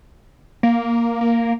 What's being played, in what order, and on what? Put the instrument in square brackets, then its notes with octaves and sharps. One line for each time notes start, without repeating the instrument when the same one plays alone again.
[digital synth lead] A#3
A#3